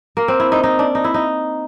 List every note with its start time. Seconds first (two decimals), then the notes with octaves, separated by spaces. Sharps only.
0.17 A#3
0.28 C4
0.40 E4
0.52 D#4
0.64 D#4
0.79 D4
0.95 D#4
1.04 E4
1.14 D#4